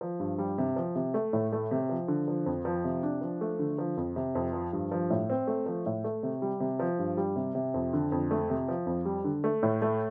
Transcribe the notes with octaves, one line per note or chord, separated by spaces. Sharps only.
F3
G2
G3
C3
F3
C3
A3
A2
A3
C3
F3
D3
F3
F2
F3
C3
D4
F3
A3
D3
F3
F2
C3
F2
F3
G2
F3
A2
C4
A3
F3
A2
A3
C3
G3
C3
F3
G2
G3
C3
C3
F2
D3
F2
A3
C3
F3
F2
G3
D3
A3
A2
A3